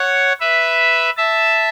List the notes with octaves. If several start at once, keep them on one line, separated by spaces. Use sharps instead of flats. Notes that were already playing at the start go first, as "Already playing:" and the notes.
Already playing: C#5 F#5
B4 E5
E5 A5